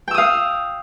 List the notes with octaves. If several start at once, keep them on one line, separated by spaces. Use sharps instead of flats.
F5 G5 D#6 E6